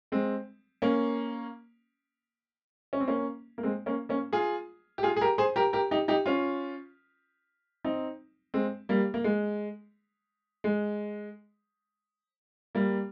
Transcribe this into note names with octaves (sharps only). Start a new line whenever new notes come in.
G#3 C4
A#3 C#4
C#4
C4
A#3 C#4
A#3
G#3 C4
A#3 C#4
A#3 C#4
F4 G#4
G4
F4 G#4
G#4
G4 A#4
G#4 C5
G4 A#4
G4 A#4
D#4 G4
D#4 G4
C#4 F4
C4 D#4
G#3 C4
G3 A#3
A#3
G#3
G#3
G3 A#3